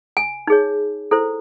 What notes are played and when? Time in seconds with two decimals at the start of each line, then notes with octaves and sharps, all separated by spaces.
0.17 G#5
0.47 D#4 G#4 C#5
1.11 E4 A4 C5